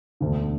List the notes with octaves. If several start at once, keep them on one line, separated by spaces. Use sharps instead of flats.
E1 D2 D3